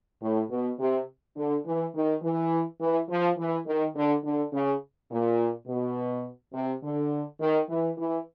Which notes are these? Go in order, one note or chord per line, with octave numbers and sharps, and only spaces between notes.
A2
B2
C3
D3
E3
D#3
E3
E3
F3
E3
D#3
D3
D3
C#3
A#2
B2
C3
D3
D#3
E3
E3